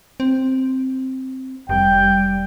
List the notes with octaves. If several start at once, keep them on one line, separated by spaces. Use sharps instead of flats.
C4
F1 G3 G5